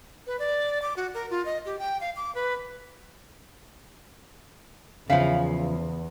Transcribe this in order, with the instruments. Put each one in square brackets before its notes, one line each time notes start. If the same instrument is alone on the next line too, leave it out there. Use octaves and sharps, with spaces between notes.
[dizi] B4
D5
D6
F#4
A#4
F4
D#5
G4
G5
F5
D6
B4
[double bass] E2 [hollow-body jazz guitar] C#3 F3 [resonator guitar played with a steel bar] E5 F5